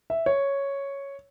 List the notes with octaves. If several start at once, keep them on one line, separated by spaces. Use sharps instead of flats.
E5
C#5